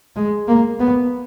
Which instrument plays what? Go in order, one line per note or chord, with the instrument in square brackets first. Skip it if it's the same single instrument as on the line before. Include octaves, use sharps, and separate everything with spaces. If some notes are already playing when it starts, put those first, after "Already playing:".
[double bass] G#3
A#3
B3